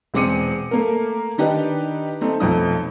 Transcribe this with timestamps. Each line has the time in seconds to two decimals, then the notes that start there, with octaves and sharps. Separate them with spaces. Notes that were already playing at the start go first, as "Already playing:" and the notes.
0.14 E1 G#3 C4 D6 C#7 D#7
0.71 A3 A#3 A#4
1.38 D#3 D4 D#4 G4 B4 D#5
2.21 A3 C4 D#4
2.40 B1 F2 A3 D#4 D#6